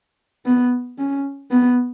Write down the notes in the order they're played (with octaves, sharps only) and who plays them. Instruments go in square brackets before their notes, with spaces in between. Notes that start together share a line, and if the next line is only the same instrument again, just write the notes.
[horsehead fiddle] B3
C#4
B3